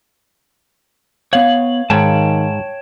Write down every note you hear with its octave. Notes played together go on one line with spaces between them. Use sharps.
B3 C#5 F5 F#7
G#2 D#3 C#5 G5 A5